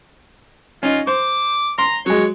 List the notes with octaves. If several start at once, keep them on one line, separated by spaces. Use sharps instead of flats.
C#4 D#4 F4
C5 D6
A#5 C6
F#3 G#3 C#5